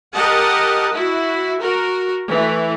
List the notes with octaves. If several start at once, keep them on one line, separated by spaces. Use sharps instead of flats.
G4 A#4 D#5 F#5 A5
E4 F#4
F#4 A#4
E3 A3